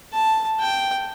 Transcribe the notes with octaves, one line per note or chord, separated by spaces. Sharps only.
A5
G5